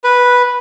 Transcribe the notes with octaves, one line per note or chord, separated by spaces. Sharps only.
B4